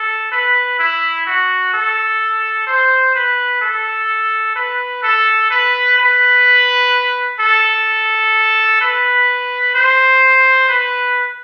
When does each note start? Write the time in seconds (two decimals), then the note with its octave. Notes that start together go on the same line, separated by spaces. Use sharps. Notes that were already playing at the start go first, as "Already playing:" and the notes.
Already playing: A4
0.31 B4
0.79 E4
1.26 F#4
1.73 A4
2.67 C5
3.15 B4
3.61 A4
4.56 B4
5.03 A4
5.50 B4
5.98 B4
7.40 A4
8.81 B4
9.75 C5
10.69 B4